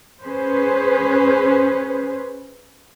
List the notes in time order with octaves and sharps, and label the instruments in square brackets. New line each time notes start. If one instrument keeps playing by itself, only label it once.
[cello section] C#4 G#4 B4 C5